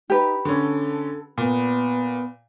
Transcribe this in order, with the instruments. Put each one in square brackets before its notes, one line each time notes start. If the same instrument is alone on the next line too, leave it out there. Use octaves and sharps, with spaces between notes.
[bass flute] D#4 [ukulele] G4 B4
[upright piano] D3 C#4 [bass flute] A4
[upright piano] A#2 [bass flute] B3